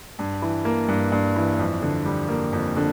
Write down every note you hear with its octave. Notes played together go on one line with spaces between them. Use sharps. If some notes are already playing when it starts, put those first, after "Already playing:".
G2
E3
A#3
G2
G2
E3
F2
D3
G3
A#3
F2
D3